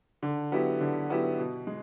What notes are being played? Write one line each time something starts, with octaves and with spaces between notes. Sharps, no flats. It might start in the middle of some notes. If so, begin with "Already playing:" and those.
D3
F#3 B3 E4 G4
D3
F#3 B3 E4 G4
B2
G#3